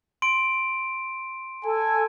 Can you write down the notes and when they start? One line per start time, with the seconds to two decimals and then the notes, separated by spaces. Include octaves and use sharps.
0.22 C6 D7
1.65 A4 G#5